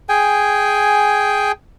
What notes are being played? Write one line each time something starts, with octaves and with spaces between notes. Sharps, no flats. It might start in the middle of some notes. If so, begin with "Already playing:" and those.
G#4 G5 G#5